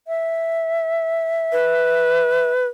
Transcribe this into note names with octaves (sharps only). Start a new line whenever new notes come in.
E5
B4